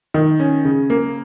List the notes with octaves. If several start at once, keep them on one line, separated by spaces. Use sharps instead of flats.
D#3
C#4
C#3
A#3